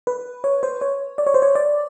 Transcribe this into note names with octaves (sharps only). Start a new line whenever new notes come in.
B4
C#5
C5
C#5
D5
C#5
C5
C#5
D5